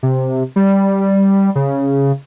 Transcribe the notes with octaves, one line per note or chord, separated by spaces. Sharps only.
C3
G3
C#3